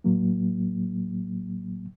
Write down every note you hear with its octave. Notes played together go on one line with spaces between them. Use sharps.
A2 F#3 A#3